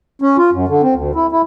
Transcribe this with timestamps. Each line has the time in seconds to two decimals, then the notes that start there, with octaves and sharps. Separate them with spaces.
0.22 C#4
0.38 F4
0.53 F#2
0.68 D3
0.83 C4
0.95 D2
1.15 E4
1.32 E4